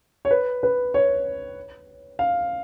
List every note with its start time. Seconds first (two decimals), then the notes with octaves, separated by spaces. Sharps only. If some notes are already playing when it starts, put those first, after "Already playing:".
0.25 C#5
0.31 B4
0.63 B4
0.94 C#5
2.19 F5